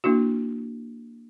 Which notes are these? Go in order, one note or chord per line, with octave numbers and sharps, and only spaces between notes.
A#3 D4 E4 F#4